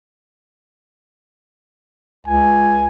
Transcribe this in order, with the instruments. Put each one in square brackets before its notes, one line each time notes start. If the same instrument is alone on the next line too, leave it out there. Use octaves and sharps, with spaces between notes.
[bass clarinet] C#2 [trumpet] G#5